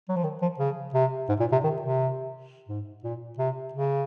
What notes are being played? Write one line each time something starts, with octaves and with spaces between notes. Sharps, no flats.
F#3
F3
D#3
F3
C#3
C3
G#2
A#2
C3
D#3
C3
G#2
A#2
C3
C#3